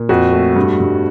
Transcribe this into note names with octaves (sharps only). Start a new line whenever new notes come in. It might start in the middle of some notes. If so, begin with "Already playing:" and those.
Already playing: A#2
F2 F#4
A3
G2
G2